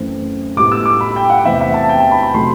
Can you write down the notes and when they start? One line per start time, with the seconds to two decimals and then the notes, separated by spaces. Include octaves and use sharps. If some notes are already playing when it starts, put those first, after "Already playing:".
Already playing: F#2 E3 A3 C4
0.56 A2 G3 B3 D6
0.72 E6
0.86 D6
1.01 B5
1.16 G5
1.30 F#5
1.45 E2 C3 E3 A3 C4 E5
1.60 E5
1.74 A5
1.89 G5
2.00 A5
2.11 B5
2.23 B5
2.33 C3 F#3 A3 C4 C6